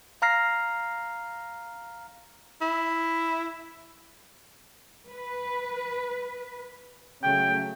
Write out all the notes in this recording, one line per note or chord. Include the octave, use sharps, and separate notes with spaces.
F5 A#5 F6 A#6 C7
E4
B4
C#3 F#3 A3 G5